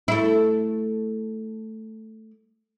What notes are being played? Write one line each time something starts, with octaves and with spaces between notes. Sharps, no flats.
A3 E4